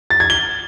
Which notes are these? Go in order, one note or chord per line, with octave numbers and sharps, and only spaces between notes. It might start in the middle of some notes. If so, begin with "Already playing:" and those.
A6
G#6
G7